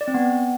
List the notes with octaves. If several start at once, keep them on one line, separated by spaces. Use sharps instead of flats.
D5
C4
B3